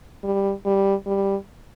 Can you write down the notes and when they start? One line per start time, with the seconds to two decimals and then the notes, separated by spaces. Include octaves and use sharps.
0.24 G3
0.65 G3
1.06 G3